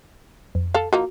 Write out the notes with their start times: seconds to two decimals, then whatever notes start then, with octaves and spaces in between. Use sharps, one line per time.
0.55 F2
0.74 A4 F5
0.93 F3 A#3 D#4 F#4